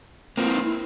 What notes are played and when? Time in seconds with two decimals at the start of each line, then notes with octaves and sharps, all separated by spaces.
0.37 A#3 C4 F4
0.45 E4
0.54 D#4
0.61 E4